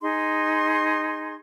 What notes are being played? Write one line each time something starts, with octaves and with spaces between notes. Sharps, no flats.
D#4 G#4 C6